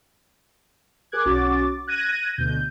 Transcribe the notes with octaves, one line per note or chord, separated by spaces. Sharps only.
G#4 A#4 D6 F#6 G#6
B1 C#4 F#4 D6 A6
F#6 G#6 A#6 D#7
D2 B2 G6